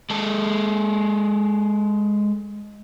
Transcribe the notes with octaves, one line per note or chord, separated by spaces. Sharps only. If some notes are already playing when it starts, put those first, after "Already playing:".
G#3 A4